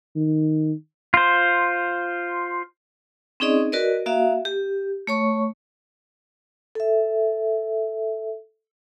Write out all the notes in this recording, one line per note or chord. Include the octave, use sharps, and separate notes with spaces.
D#3
F4 C5
C4 C#4 D#4 G#4 D5 D#5
F#4 A#4 B4 D5 D#5
A#3 F#4 E5 F5
G4
A3 C#5 C#6
A4 E5